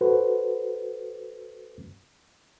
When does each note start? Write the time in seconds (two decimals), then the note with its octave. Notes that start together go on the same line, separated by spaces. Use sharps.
0.01 F#4 A4 B4 C5